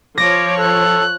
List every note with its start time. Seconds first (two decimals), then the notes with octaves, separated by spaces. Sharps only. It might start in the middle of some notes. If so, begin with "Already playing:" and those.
0.18 F3 C#5 D6 A#6
0.59 A4 F#6